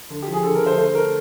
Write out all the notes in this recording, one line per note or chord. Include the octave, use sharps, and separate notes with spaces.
D3
G4
F3
G#4
D3 A4
A#4
D3
C5
A3 C5
A3 A#4